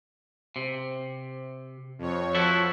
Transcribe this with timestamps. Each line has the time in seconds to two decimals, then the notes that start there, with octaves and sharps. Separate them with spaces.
0.56 C3
1.99 F2 C#5
2.35 F3 E4 F#4 A4